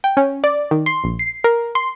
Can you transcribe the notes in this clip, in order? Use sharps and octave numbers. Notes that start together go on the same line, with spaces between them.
G5
C#4
D5
D#3
C6
A#1
C7
A#4
C6